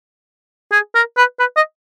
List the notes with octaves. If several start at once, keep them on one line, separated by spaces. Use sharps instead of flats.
G#4
A#4
B4
B4
D#5